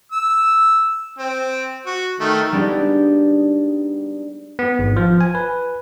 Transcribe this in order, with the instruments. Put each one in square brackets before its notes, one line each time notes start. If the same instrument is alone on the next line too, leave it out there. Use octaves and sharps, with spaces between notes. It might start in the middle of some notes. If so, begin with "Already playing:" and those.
[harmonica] E6
C4
F#4
D#3 A3
[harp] G3 G#3 B3 D4 D#4 G4
[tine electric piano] B3
G#1
F3
G#5
B4